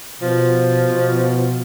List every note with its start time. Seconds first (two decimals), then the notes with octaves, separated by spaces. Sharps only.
0.21 B2 F3
0.89 B2